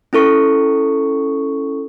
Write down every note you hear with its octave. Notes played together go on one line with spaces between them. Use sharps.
C#4 E4 A4 C#6